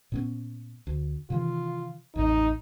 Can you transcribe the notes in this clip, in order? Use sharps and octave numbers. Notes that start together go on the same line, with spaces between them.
A#2 B3 C#4
D2
C3 D#3 E3 F4
A1 F2 A2 D#4